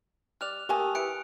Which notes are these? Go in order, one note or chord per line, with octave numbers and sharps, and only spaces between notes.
G3 D5 F6 F#6 F7
A3 A#3 G4 G#5 D#6
E3 E4 F#6 C#7 D7